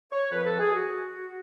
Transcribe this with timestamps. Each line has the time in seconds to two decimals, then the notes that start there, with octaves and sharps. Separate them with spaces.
0.11 C#5
0.31 F2 F3 B4
0.45 A4
0.59 G#4
0.73 F#4